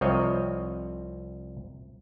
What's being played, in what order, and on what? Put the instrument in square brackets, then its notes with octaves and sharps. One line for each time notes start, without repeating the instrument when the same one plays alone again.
[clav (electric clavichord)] C2 F3 C4 C#5 D#5